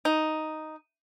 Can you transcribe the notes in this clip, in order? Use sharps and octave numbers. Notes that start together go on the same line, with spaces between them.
D#4